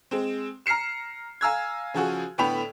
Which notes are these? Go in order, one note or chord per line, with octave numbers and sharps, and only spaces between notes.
G#3 C4
A#5 F6 C7 C#7 E7
F5 G#5 A#5 E6 F6 G#6
C#3 F3 F#4 G#4
A2 D3 B3 G5 B5 F7